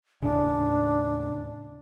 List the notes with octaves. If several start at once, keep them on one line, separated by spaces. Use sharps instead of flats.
D#2 A2 C#3 D4